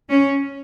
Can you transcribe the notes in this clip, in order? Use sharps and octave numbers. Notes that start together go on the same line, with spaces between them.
C#4